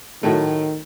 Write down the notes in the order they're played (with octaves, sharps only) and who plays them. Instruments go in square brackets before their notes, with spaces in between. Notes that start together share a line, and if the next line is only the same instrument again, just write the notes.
[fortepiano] A2 F#3 A3 [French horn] D#3